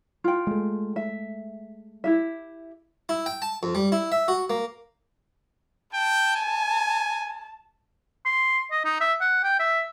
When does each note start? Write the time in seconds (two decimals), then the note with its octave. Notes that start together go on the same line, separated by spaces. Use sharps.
0.24 F4 G5
0.47 G#3 A3
0.96 E5
2.04 E4 G4 E5
3.09 E4
3.26 G5
3.42 A5
3.63 F2
3.75 G3
3.92 E4
4.12 E5
4.28 F#4
4.50 A#3
5.94 G5 A5
6.36 G#5
8.25 C6
8.71 D#5
8.85 D#4
9.01 E5
9.21 F#5
9.43 G5
9.59 E5